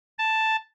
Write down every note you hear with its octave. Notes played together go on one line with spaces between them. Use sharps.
A5